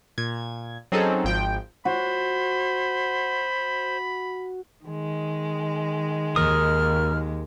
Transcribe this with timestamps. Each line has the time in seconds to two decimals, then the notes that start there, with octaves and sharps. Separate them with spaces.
0.18 A#2 G#6
0.92 F#3 C4 C#4 D#4 G#4 A4
1.24 G#1 F3 G5
1.85 F#4 C5 B5
4.85 D#3 G#3
6.36 D#2 A#4 D#6 F6